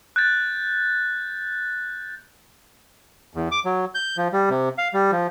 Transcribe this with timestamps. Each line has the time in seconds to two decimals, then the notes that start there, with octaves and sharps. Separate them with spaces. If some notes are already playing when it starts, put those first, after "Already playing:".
0.16 F#6 G6 A6
3.34 E2
3.52 D6
3.65 F#3
3.95 G6
4.17 F3
4.33 G3
4.50 C3
4.78 F5
4.94 G3
5.12 F3